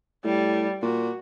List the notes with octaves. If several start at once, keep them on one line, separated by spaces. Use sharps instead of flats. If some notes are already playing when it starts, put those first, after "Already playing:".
A2 G3
A#2 F#4